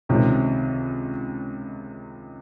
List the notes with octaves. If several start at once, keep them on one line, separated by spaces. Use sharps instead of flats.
C#2 C3 D#3